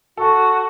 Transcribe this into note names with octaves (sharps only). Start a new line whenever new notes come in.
F#4 A4